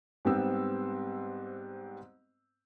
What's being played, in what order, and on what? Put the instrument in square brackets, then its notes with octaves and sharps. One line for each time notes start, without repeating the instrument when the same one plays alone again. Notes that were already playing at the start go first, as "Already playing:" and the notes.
[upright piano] G#2 G3 B3 C4 E6